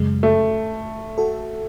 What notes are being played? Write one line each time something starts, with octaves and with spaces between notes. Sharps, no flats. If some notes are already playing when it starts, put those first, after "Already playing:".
Already playing: F#2 C#3 G#3
A3
F#4 A4